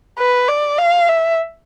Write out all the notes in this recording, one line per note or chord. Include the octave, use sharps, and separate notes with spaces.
B4
D5
F5
E5